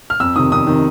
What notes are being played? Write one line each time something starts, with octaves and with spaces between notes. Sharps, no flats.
F6
F2 E6
C3 D#3 D#6
F2 D#6
C3 D#3